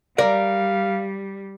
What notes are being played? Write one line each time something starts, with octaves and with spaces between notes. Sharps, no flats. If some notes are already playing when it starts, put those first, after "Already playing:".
G3 A#4 D5 F5